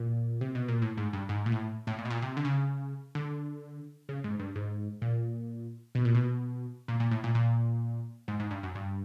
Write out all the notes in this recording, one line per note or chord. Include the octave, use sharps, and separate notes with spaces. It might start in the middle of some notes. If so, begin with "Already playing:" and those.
Already playing: A#2
C3
B2
A#2
A2
G#2
G2
G#2
A#2
A2
A2
A#2
B2
A#2
C3
D3
C#3
D3
C#3
G#2
G2
G#2
A#2
B2
A#2
B2
A#2
A#2
A2
A#2
A#2
G#2
G#2
G2
F#2
G2